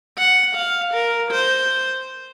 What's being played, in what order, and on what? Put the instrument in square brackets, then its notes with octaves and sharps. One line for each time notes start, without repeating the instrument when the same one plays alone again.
[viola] F#5
F5
A#4
C5